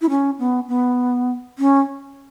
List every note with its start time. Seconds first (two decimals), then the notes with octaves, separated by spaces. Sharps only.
0.01 E4
0.10 C#4
0.39 B3
0.68 B3
1.58 C#4